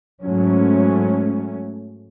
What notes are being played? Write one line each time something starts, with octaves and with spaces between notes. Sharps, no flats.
G#2 F#3 A3 C#4